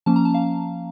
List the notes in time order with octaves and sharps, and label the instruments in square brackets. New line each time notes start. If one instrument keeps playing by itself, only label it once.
[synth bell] F3 A#3 C#4 A5
A#5
A5
F5